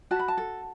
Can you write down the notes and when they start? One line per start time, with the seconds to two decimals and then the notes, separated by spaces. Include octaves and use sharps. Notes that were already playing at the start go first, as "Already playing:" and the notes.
0.11 F#4 A5
0.19 B5
0.28 A5
0.38 A4